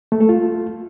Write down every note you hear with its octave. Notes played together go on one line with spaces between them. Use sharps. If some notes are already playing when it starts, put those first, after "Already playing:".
A3
A4
F4